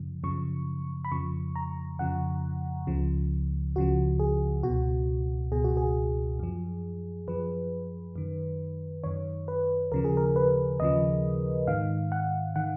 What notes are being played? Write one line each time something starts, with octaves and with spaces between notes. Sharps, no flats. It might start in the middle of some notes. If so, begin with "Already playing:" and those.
Already playing: F#2 C#3 F3
F#2 C#3 F3 C#6
B5
F2 C#3 F3 C#6
A#5
F2 C#3 F3 F#5
C#2 C#3 F3
C#2 C#3 F3 F#4
G#4
C#2 B2 F#4
C#2 B2 G#4
F#4
G#4
F#2 F3
F#2 F3 B4
F#2 D#3
F#2 D#3 C#5
B4
D#2 C#3 F3 A#4
G#4
A#4
B4
D#2 C#3 F3 D#5
G#2 D#3 F5
F#5
D#3 F#5